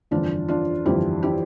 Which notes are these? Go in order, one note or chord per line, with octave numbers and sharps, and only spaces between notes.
G1 F2 E3 D4 F4
D4 F4
G1 F2 E3 E4 G4
E4 G4